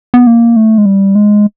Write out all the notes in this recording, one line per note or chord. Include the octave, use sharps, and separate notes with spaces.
B3
A#3
A3
G#3
G3
G#3